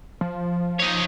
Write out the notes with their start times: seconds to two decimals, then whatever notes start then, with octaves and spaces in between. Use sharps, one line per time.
0.21 F3
0.79 D#4 C#5